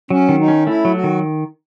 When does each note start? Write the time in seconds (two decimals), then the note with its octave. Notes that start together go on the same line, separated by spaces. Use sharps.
0.10 F#3 C#4
0.29 D#3
0.39 D#4
0.48 C#4
0.67 A3 E4
0.85 F#3
0.94 F#4
1.04 D#3